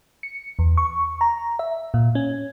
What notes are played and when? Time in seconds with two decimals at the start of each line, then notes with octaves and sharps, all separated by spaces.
0.23 C#7
0.59 E2
0.77 C#6
1.21 A#5
1.59 E5
1.94 A#2
2.15 C#4